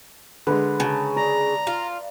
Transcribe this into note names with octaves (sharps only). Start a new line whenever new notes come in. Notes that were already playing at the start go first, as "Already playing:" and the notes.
D3 G#3 B4
C#3 A5 A#5
D5 A#5
F4